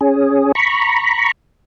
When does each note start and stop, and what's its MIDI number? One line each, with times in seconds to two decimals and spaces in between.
0.01 0.52 61
0.01 0.52 68
0.55 1.32 82
0.55 1.32 83
0.55 1.32 85